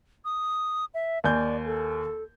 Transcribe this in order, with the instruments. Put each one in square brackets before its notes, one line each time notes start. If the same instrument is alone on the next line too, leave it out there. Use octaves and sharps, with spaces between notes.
[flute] D#6
E5
[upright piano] D#2 G#5 G6 [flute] D5
[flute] A4